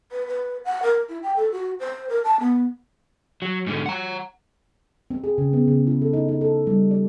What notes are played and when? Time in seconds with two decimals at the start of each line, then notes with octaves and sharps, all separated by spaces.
0.12 B4
0.28 B4
0.65 F#5
0.83 A#4
1.09 E4
1.23 G5
1.36 A4
1.52 F#4
1.80 C5
2.09 A#4
2.24 A5
2.40 B3
3.42 F#3
3.67 G#2 D3
3.86 F#5 A#5
5.10 C4
5.24 G#4
5.38 C#3
5.53 B3
5.68 C#3
5.87 E4
6.02 A4
6.13 D#4
6.28 D#4
6.41 A4
6.67 G3
6.91 D5